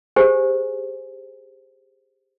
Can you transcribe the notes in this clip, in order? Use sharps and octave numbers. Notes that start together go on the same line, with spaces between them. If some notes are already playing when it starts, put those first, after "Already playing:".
G4 G#4 C5 G#5